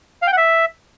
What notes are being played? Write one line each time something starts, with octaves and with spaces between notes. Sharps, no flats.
F5
G5
F#5
E5